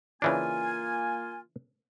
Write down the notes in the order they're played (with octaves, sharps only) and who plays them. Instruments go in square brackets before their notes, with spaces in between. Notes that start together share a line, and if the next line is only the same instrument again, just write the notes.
[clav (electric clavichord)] C#3 E3 D4 [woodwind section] A#3 F4 G#5